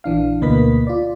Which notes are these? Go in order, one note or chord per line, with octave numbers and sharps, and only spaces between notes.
A#1 E3 D4 F5
D2 B2 A#3 B4 D#5 B6
F4 D5